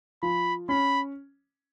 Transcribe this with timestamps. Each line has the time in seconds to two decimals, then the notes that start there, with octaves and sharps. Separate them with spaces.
0.23 F3 B5
0.69 C#4 B5